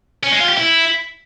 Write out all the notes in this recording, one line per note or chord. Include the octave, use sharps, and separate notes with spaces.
C#4
G#3
F4
G4
E4